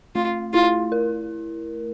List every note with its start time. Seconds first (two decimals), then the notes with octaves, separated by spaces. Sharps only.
0.15 A3 F4
0.53 E4 F4
0.92 A#4